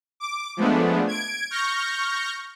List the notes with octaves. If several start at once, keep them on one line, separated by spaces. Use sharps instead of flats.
D6
F3 G#3 A3 B3 D4
G#6 D7
C#6 F6 G6 A#6